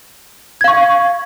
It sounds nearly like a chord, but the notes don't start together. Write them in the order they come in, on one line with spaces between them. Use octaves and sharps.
G#6 F5 C#6